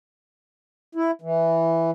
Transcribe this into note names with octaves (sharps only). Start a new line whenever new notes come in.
E4
E3